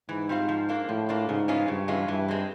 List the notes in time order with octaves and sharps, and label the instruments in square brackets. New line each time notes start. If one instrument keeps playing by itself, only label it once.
[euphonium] G#2 [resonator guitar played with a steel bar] E3
[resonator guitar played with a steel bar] G3 C4 F4
F3
A#3 D4 F4
[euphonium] A2 [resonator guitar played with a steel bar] F3
[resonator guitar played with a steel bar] A#3 D4 F4
[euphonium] G#2 [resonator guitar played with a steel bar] C#3
[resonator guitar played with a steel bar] E3 G#3 C#4 F4
[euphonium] G2 [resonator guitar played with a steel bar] C#3
[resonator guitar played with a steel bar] E3 G#3 C#4 F4
[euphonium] G2 [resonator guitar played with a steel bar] E3
[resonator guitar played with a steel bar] G#3 C4